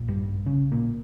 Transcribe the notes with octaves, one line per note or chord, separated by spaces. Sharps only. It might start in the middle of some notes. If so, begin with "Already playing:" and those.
Already playing: A#1 A#2
G2 G3
C#3 C#4
A#2 A#3